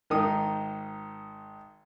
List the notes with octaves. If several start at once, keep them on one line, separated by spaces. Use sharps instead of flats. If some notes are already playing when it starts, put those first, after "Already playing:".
G#1 D#3 D#4 D#6